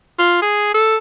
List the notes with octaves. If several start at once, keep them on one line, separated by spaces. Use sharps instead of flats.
F4
G#4
A4